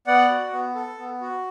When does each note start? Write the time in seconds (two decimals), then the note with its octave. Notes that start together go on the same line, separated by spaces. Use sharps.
0.07 B3 D5 F#5
0.30 F#4
0.53 B3
0.75 A4
0.98 B3
1.21 F#4